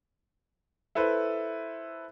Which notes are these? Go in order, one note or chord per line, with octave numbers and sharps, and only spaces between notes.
E4 A4 B4 C5